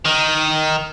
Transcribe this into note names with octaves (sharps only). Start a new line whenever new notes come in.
D#3